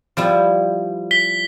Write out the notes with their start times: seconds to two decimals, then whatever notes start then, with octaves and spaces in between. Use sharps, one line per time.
0.17 F3 G3 E4
1.11 B6 G7